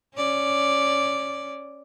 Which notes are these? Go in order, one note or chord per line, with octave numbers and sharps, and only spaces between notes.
C#4 D5